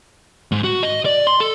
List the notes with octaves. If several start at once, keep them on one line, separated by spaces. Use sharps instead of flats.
G#2
F#4
D#5
D5
C6
A4